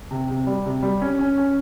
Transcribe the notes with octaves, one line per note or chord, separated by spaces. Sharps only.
C3
C3
G3
C3
G3
C#4
C#4
C#4